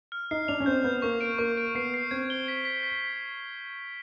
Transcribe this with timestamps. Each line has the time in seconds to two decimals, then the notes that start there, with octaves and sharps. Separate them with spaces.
0.12 F6
0.31 D#4 C7
0.48 D4 F7
0.60 C#4
0.66 C4 G6
0.84 B3 G6
1.02 A#3 C#6
1.21 D7
1.38 A#3 C#6
1.57 D7
1.75 B3 C7
1.94 C7
2.11 C4 G#6
2.30 G7
2.48 B6
2.65 B6
2.83 B6